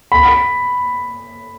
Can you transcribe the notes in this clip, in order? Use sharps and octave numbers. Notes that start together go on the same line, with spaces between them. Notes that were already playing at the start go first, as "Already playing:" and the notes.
B5